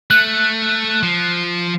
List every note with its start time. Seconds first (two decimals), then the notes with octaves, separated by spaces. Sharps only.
0.11 A3 F#6
1.03 F3